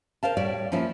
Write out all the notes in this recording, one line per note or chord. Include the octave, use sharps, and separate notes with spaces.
A#4 C5 F5 A5
A2 G3 C#5 D5
F3 A#3 C#4 E4 F4